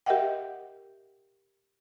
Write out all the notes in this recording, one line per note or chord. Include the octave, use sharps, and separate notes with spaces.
G4 A#4 D#5 E5 F#5 G5